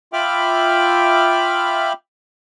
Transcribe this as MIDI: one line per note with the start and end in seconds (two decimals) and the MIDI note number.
0.13 1.93 65
0.13 1.93 76
0.13 1.93 79
0.13 1.93 83
0.13 1.93 86
0.13 1.93 89